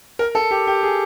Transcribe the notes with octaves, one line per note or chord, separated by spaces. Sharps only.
A#4
A4
G4
G4
G#4